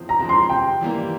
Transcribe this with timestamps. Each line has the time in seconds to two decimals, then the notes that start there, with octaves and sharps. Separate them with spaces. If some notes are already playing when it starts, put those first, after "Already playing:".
Already playing: E2 C#3 F3 C4
0.09 A#5
0.19 C#3 F3 G#3 C4
0.29 C6
0.49 C3 G5
0.81 E3 G3 A#3